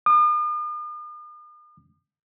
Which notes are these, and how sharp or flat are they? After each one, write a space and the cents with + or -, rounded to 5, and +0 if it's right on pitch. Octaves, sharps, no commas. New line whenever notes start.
D#6 -45